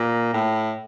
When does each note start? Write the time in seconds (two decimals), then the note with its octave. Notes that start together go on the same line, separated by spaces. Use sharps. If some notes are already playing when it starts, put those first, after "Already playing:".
Already playing: A#2
0.34 A2